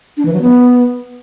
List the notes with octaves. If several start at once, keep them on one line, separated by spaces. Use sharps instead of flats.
D4
E3
F#3
B3